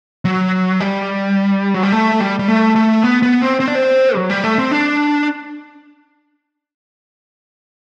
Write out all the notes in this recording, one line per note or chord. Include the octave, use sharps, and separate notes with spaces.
F#3
G3
F#3
G3
A3
G3
G3
A3
A3
B3
B3
C4
C4
D4
C4
F#3
G3
A3
C4
D4